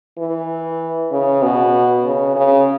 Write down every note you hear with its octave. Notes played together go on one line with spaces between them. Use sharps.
E3
C#3
B2
C#3
C#3